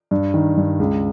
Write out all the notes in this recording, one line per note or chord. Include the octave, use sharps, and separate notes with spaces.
G2
D#3
G2
C#2